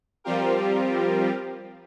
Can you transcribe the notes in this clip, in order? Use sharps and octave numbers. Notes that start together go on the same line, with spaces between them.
F3 G3 C4 F4 G4 A#4